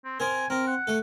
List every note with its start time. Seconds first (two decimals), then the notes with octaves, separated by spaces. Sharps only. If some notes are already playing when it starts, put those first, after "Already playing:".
0.05 C4
0.20 C4 A#4 G#5
0.50 C4 A#4
0.67 F#5
0.87 A3 A4